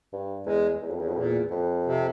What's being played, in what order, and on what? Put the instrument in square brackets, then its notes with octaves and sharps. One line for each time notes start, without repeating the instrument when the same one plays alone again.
[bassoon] G2
[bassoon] E2 [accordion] G#3
[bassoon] E2
F2
E2
F2
[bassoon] E2 [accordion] A#2
[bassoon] F2
[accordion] C3